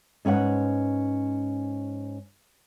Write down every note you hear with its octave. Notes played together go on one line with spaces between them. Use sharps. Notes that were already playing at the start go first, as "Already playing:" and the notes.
G#2 C#4 B4 F#5